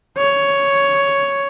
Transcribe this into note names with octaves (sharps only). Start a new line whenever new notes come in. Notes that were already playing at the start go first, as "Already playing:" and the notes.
C#5